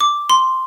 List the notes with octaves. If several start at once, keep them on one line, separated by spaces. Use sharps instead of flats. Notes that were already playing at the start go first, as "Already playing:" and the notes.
D6
C6